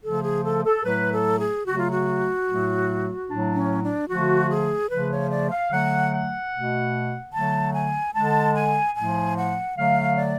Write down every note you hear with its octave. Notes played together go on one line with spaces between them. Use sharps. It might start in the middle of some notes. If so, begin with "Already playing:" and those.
C#3 F3 A3 A4
G#4
A4
A4
A2 F#3 A3 B4
A4
G#4
C#3 F#3 A3 F#4
F4
F#4
A2 F#3 A3
A2 F#3 A3 D4
C#4
D4
D3 F3 A3 F#4
G#4
C#3 F3 A3 B4
C#5
D5
F5
D3 F#3 A3 F#5
F#5
B2 A3
D3 F#3 A3 A5
G#5
D3 G#3 A5
G#5
A2 F3 A3 G#5
F#5
D3 F#3 A3 F5
D5